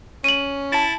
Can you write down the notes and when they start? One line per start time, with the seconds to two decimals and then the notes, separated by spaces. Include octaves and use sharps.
0.24 C#4 D#7 F#7
0.72 E4 A5 A6